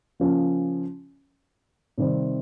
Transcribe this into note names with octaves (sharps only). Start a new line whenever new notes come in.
C#3 F3 A#3 C#4
C3 D#3 G3 C4